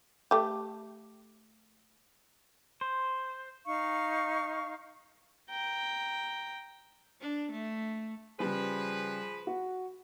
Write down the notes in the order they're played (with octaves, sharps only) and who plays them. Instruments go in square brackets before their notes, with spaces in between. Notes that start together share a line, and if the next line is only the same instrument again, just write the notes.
[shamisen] A3 G4
[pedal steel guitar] C5
[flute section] D#4 F5 C#6
[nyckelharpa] G5 A#5
[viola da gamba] D4
A3
[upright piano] C#3 G3 [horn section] F3 G#4 B4
[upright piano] F#4